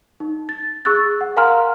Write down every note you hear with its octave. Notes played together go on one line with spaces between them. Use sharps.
D#4
A6
G#4 C#6 E6 F#6 A6
F#5
A#4 F5 G#5 A#5 C6 F6